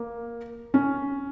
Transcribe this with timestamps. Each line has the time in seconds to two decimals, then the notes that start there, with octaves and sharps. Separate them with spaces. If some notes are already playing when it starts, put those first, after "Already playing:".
Already playing: A#3
0.74 C#4